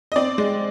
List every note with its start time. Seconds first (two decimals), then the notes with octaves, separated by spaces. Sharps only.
0.12 D#5
0.16 C4 D5
0.38 G#3